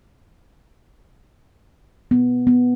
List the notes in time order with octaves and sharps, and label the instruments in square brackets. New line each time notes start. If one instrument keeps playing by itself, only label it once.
[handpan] B3
B3